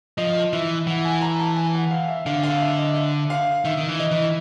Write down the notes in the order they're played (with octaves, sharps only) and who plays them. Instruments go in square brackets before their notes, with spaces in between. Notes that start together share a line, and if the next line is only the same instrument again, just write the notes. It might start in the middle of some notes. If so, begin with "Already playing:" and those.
[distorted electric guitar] F3 [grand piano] D#5
[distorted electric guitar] E3 [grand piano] E5
[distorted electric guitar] E3 [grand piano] F#5
[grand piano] G#5
A#5
A5
G#5
F#5
F5
E5
[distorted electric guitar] D3 [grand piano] F5
[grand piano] F5
E5
D#5
E5
F5
[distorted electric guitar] D#3 [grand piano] E5
[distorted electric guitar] D#3
E3
[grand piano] D#5
[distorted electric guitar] E3